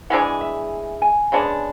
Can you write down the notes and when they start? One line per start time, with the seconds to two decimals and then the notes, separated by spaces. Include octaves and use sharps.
0.10 E3 G#3 D4 G#4 F#5
0.41 E5
1.02 G#5
1.32 C#3 G#3 B3 D4